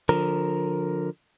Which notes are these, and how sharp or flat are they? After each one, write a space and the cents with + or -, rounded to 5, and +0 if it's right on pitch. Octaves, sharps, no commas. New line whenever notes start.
D3 +0 F3 +30 A#4 +0